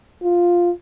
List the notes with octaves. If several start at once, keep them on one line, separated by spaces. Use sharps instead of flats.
F4